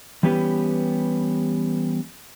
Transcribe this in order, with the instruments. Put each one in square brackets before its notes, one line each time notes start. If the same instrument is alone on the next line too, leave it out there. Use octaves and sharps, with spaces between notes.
[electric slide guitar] E3 G3 B3 C#4 G4 B4